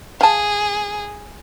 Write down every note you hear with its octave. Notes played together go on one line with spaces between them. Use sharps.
G#4 F5 A5